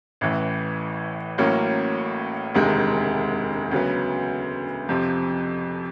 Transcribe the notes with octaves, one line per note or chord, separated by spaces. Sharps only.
A1 A2 E3
A1 A2 F#3 A#3 C#4
E1 D2 C3 D#3 G#3
D2 C#3 F#3 B3
F2 C3 F3